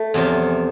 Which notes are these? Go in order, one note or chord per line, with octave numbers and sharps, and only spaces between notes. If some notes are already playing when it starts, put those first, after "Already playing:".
Already playing: A3
E2 C3 F3